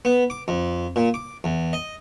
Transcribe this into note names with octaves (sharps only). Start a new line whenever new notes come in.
B3
D6
F2
A#2
D6
E2
D#5